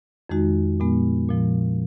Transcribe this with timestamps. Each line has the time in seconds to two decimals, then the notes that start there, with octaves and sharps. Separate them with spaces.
0.30 F2 D#3 G#3 D#4 F#4
0.80 A#2 F3 G#3 B3
1.29 A#2 F3 G#3 B3